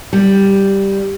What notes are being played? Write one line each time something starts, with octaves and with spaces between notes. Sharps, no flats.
G3